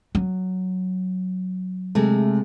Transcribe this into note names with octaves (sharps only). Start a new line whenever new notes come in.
F#3
C3 G#3 A3